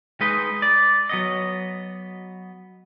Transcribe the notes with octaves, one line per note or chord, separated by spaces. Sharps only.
G#3 D#4 B4 D#5
D5
F#3 B3 D#5